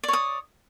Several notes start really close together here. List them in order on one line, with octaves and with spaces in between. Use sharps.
D5 C#5 D#6